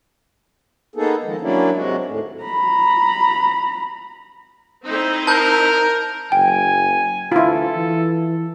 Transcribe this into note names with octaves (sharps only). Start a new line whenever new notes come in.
A#3 B3 D#4 G#4 A4
D#3 F3 G#3
F#3 A#3 C#4 D4 E4
G#2 C3 G#3 F#4
D#2 A2
A#5 B5
C4 D#4 E4
A#4 A5 G6
F#1 G5 G#5
D2 E4 F4 A4
E3